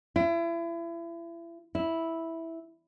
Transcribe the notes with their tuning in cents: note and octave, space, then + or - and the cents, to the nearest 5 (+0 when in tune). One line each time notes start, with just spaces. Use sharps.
E4 +35
E4 -5